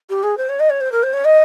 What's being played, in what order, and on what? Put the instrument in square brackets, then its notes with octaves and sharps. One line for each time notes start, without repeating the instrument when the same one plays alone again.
[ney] G4
G#4
C5
C#5
D#5
C#5
C5
A#4
C5
C#5
D#5